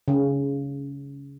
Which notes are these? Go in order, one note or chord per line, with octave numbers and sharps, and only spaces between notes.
C#3